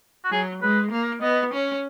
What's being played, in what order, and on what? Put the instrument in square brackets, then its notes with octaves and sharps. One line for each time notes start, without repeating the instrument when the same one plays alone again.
[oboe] F#4
[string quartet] F#3 [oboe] G#4
[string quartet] G#3 [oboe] B4
[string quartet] A#3
[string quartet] B3 [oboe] D#5
[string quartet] C#4